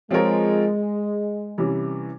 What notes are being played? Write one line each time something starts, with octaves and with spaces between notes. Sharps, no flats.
F3 G#3 C4 F4 A#4 C#5
C3 E3 G3 C#4